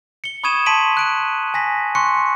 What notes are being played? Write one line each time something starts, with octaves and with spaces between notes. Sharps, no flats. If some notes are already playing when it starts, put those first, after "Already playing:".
C#7 G7
B5 C#6 D#6 G#6 D#7 E7
A5 C6 B6 D7 D#7 F#7
F#6 D7 D#7
G#5 A#6 B6
C6 C#6 F#6 C#7